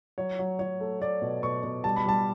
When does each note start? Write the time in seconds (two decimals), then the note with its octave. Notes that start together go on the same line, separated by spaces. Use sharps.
0.18 F#3 C#5
0.39 F#3
0.59 F#3 C#5
0.81 A3
1.01 A3 D5
1.22 B2
1.43 B2 C#6
1.63 B2
1.84 G3 A5
1.96 B5
2.06 G3 A5